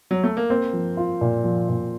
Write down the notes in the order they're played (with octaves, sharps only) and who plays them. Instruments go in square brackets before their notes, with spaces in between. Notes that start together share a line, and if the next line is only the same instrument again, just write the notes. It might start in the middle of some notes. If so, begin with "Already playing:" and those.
[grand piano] F#3
A3
A#3
[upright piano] A#3 [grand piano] C4
[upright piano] F3
F4
A#2
F3
A#2